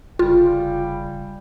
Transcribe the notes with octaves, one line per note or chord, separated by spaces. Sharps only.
F1 C#3 G3 F4 G5